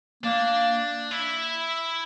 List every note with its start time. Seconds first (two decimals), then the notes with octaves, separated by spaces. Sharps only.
0.24 A#3 D4
1.11 E4